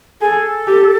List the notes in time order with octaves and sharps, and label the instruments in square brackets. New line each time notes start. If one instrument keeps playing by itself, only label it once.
[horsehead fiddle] G#4 [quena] A4
[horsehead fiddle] G4